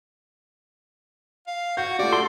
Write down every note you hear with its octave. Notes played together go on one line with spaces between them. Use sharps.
F5
F#4 G6
A3 F4 G4 D5
A4 C6